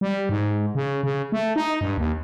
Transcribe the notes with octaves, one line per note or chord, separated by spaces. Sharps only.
G3
G#2
C#3
C#3
A3
D#4
G2
D#2